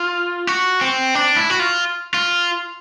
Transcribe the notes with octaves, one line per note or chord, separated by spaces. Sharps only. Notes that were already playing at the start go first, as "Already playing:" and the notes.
Already playing: F4
F#4
C4
D4
E4
F#4
F4
F4